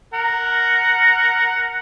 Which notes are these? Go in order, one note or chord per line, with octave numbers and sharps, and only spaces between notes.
A#4 F#5